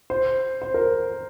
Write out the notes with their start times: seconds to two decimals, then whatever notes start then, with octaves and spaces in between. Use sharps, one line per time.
0.10 C5
0.62 C5
0.74 A#4